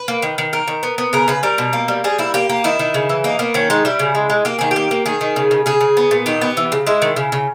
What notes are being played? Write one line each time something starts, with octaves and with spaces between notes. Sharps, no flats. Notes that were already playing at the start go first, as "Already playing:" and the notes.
Already playing: B4
A#3
D#3
D#3
A#3 A#4
D#3
B3
B3
C#3 A#4
C#3 B4
G3 A#4
B2
A#3
G3
G3 G#4
A#3 E4
A#3 G4
A#3
D#3 E4
D#3
C#3
E3
A#3 D#4
A#3 B3
D#3 C#4
G#3 D#4
G3 E4
C#3
G#3
G#3
A#3 G4
D#3 G#4
G4
A#3
A#3
D#3 G#4
D#3
C#3
C#3
C#3 G#4
C#3
B3
A#2
D#3 G4
B3
E3
C#3
G#3 E4
D#3
C#3
C#3